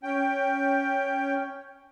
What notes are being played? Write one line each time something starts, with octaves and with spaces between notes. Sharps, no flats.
C#4 G5